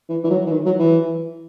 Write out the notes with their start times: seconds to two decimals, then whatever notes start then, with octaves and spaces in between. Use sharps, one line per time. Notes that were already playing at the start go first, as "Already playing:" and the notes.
0.09 E3
0.24 E3
0.30 F#3
0.46 E3
0.51 D#3
0.65 F#3
0.79 E3